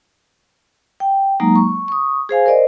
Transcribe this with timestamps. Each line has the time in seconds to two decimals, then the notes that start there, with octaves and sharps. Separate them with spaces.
1.00 G5
1.40 F#3 G#3 A#3 D#4 A#5
1.56 C#6
1.88 C#6 D#6
2.29 G#4 C5 F5 G#5
2.46 A#4 C5 D5 D#5